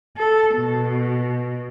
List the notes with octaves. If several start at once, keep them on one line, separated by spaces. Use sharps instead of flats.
A4
B2